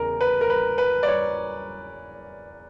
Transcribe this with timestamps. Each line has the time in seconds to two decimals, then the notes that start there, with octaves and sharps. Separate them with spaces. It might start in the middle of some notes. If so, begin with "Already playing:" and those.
Already playing: E2 C#3 A#4
0.21 B4
0.41 A#4
0.50 B4
0.78 B4
1.03 D5
1.07 C#5